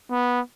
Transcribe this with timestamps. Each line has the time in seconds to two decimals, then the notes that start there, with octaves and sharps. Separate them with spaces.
0.11 B3